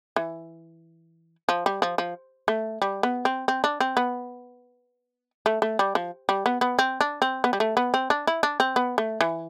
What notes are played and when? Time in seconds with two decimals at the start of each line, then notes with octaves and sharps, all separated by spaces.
0.16 E3
1.49 F3
1.66 G3
1.82 F3
1.98 F3
2.48 A3
2.82 G3
3.03 B3
3.25 C4
3.48 C4
3.64 D4
3.80 C4
3.97 B3
5.46 A3
5.62 A3
5.79 G3
5.95 F3
6.29 G3
6.46 B3
6.61 B3
6.79 C4
7.01 D4
7.22 C4
7.44 B3
7.53 G3
7.60 A3
7.77 B3
7.94 C4
8.10 D4
8.27 E4
8.43 D4
8.60 C4
8.76 B3
8.98 A3
9.21 E3